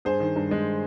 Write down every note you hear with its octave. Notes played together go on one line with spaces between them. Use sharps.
G2 G#4 C5
D#3
G2
G#3